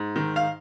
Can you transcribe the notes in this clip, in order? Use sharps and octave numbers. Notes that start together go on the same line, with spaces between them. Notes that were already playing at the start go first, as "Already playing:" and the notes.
Already playing: G#2
D#3
F5